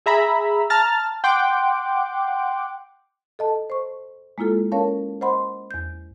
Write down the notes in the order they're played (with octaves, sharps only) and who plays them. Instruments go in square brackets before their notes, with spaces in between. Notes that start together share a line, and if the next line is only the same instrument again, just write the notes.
[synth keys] G#4 E5 A#5 B5
A5 A#5 F6 A6
F#5 G5 C6 D6
[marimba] A4 D#5 A5
C5 C#6
G#3 A#3 E4 F4 A4
C#4 A#4 C#5 F5 A5
C5 D#5 F#5 B5 C6
E2 G6